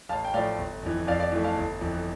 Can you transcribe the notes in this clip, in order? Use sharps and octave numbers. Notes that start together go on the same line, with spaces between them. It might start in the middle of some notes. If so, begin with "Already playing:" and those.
A1 F5 A5
G5
A2 F3 A3 D5 F5
G1
F2 E3
F2 D5 F5
D5 F5
E3 A3
F5 A5
G1
F2 E3